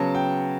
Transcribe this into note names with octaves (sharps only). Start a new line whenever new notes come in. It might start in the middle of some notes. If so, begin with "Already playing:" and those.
Already playing: C#3 F#3 B3 A5
G5